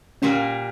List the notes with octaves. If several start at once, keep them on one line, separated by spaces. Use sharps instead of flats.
A#2 G3 A#3 C#4